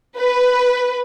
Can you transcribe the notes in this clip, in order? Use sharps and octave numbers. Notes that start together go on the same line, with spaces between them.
B4